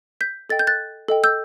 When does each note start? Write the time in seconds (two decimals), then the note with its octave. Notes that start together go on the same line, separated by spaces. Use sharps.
0.21 G6 B6
0.50 A4 D#5 G5 A6
0.59 G6
0.67 F#6 A6
1.08 A4 D#5 G5
1.24 E6 G6